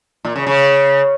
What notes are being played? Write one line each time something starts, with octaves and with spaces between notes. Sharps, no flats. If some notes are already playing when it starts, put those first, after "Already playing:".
A#2
C#3
C#3